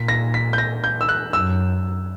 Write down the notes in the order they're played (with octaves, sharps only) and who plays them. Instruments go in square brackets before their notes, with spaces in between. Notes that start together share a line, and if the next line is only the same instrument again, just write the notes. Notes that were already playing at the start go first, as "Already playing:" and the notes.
Already playing: [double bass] A#2 [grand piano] B6
[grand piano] A#6
B6
G6
A#6
G6
E6
F#6
[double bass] F#2 [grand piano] E6